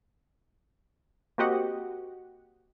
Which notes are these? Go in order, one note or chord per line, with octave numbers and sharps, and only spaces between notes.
A#3 C4 F#4 G4 D#5 F#5